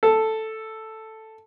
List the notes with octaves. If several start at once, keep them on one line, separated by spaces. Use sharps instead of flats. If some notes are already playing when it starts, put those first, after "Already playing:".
A4